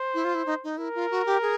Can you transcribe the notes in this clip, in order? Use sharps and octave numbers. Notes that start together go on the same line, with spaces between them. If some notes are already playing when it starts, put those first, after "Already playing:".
Already playing: C5
E4
F4
E4
D#4
D#4
E4 A#4
F4
F#4
G4
G#4